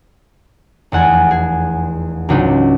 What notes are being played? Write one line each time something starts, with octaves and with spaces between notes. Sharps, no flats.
F1 E2 F#5 G#5
G#4
C#2 G#2 F#3 D4 D#4